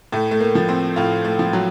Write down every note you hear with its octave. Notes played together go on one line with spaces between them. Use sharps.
A2 A3
A3
A#3
F3
C4
A2 F4
A3
F3
F#3